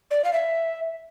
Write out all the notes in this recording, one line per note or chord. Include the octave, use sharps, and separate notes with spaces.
D5
F5
E5